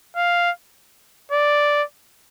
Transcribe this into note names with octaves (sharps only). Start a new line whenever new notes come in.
F5
D5